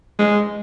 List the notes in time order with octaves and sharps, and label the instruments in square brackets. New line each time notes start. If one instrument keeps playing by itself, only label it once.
[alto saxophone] G#3